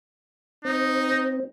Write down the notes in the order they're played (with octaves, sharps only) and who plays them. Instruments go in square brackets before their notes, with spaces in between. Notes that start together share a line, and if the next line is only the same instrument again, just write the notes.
[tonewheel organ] C4 [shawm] D#4